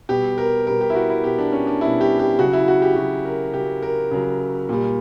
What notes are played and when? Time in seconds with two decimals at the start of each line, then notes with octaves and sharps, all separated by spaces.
0.09 B2 G3 G4
0.38 A#4
0.67 B2 G3 A#4
0.81 G4
0.90 E4
0.95 F#4
1.10 E4
1.24 B2 G3 G4
1.38 D4
1.52 C#4
1.67 D4
1.81 B2 G3 E4
2.01 G4
2.19 G4
2.39 C#3 F#3 F#4
2.53 E4
2.68 F#4
2.82 G4
2.96 C#3 F#3 F#4
3.25 A#4
3.54 C#3 F#3 G4
3.82 A#4
4.11 C#3 F#3
4.69 A#2 G3